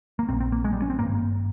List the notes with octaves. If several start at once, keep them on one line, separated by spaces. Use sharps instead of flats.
A#3
A#1 A#2 C4
C4
A#3
G#3
G3
C#4
C4
G#1 G2 A#3